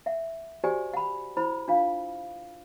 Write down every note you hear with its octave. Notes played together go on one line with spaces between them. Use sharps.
E5 F#5
F#4 G4 C5 D5 G#5
F#5 B5
E4 C5 B5
D4 F4 F5